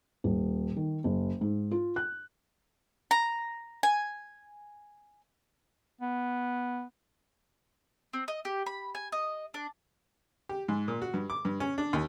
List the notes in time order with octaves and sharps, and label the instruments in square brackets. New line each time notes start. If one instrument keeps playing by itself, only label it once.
[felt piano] D#1
D#3
F#1
G#2
F4
F#6
[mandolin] A#5
G#5
[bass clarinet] B3
[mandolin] C4
D#5
G4
B5
G#5
D#5
D4
[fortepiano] G4
G#2
A#2
F#4
G2
D6
G2
C#4
D4
D#2